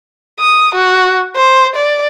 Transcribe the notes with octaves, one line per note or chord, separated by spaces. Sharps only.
D#6
F#4
C5
D5